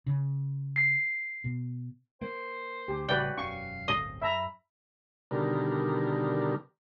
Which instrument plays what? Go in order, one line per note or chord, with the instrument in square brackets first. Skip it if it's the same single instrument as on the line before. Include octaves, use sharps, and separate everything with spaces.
[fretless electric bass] C#3
[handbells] C7
[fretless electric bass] B2
[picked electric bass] A#3 [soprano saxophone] C5
[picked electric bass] D2 [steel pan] G4
[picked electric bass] A1 C#3 G3 [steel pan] F#4 B4 D5 [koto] G5
[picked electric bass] E1 F#2 C#4 [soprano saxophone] F5 [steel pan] C#6
[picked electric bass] D1 G1 C4 [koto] D#5
[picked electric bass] F#2 [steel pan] E5 A#5 [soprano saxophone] B5
[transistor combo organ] B2 D3 D#3 G3 A#4